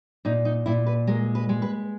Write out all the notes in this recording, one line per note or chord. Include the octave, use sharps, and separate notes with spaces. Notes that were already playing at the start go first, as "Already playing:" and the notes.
A#2 D#4
D#4
A#2 E4
B4
G#3 A#4
B4
G#3
B4